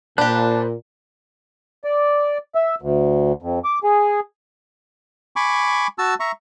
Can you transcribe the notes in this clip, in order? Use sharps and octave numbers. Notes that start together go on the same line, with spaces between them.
A#2 D4 G4 C5 A5 B5 F#6
D5
E5
D2
F2
D6
G#4
G#5 B5 C#6 D6
F#4 A5 E6
E5 A#5 C#6